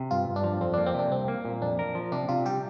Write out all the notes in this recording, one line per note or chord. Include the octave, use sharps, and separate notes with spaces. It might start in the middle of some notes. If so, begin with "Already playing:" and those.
Already playing: C3
G2 F4
G2
D4
F3
F2 C4
A#3 D4
C4
C3 D4
C2 C4
A#3
A#2
F2 D4
A#4
F3
C3 D4
C3 F4
G3 G4